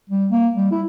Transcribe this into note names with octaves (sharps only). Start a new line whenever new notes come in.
G3
A#3
G3
E4